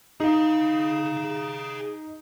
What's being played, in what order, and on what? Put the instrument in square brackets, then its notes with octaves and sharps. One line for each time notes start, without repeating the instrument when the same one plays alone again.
[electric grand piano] D#4 [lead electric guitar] G#4 F5